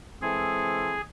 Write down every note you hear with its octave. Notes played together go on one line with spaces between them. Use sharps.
E3 G#3 C4 E4 G#4 A4